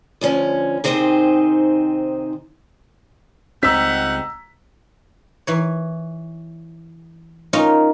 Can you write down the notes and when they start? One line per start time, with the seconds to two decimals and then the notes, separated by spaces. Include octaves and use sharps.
0.21 D2 F3 C#4
0.84 C3 D#3 C4 D#4 G#4 C5
3.63 C#2 G3 C4 D#4 F#5 A#5 E6 B6
5.47 E3 C#5
7.53 C#4 D#4 F4 A#4